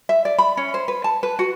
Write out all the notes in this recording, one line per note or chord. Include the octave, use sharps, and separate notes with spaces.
E5
D5
B5
C#4
C5
B4
A5
B4
F#4